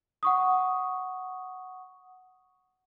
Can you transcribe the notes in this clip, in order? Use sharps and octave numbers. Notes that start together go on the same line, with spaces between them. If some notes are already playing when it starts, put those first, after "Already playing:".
F#5 C#6 D#6